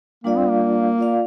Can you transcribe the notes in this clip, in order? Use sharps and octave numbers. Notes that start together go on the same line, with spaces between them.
G3 A#3 D4 F4 D5 F5
C4
A#3
F4 D5 F5